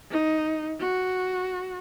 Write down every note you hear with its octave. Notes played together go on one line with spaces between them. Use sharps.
D#4
F#4